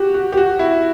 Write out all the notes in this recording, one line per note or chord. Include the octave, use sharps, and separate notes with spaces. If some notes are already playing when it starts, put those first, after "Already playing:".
Already playing: F#4 G4
F#4
G4
F#4
E4